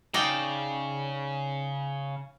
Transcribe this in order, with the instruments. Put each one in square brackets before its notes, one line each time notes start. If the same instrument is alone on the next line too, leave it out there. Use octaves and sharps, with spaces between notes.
[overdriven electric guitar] C#3 [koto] D#4 D5 G5